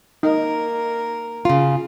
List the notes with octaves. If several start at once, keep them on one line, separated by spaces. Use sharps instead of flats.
A#3 D#4 A#4
C#3 F4